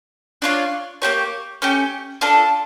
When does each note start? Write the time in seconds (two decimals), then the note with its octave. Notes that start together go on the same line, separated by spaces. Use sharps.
0.42 D4 F4 C#5 F5
1.02 A#3 D4 G4 C#5
1.62 A3 C#4 G4
2.21 D4 F4 A4